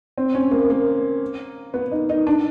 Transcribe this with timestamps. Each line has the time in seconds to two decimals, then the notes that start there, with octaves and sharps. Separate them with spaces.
0.18 C4
0.35 C#4
0.51 A#3
0.70 A#3
1.74 B3
1.92 D#4
2.10 D#4
2.27 D4